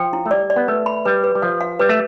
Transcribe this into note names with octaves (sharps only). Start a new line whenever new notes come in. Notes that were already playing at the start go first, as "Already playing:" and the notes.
Already playing: F3 G5
E4
A3
G3 D5
D5
B3
A3 B4
B5
G3 B4
B4
G3
F3 F5
F5
G3 B4
A3